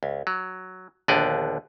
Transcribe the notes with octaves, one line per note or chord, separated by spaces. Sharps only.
C#2
F#3
A#1 D#2 D3 B3 D5 D#5